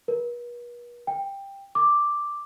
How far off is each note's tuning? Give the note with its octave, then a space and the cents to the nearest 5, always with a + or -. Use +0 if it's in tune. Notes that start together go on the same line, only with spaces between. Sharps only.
B4 -45
G5 +10
D6 +0